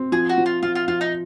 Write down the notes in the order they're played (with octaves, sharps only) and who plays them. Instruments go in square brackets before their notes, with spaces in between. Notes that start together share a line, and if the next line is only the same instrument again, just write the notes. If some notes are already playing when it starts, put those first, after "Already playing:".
Already playing: [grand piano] C4
[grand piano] F3 [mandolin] G#4
[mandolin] F#4
[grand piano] F3
[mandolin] F4
[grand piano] F3 [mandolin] F4
[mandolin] F4
[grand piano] F3 [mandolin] F4
[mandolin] D#4